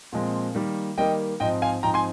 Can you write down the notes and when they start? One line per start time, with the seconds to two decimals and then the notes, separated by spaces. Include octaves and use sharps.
0.12 A#2 F3 G#3 C4
0.55 D#3 G3 A#3
0.98 D#3 G3 A#3 D#5 G5
1.40 G#2 F3 C4 D#4 D#5 G5
1.62 F5 G#5
1.83 G#2 F3 C4 D#4 G5 A#5
1.94 G#5 C6